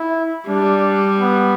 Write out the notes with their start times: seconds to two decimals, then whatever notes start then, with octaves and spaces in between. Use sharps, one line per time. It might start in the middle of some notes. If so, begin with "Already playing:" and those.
Already playing: E4
0.48 G3 D4
1.20 B3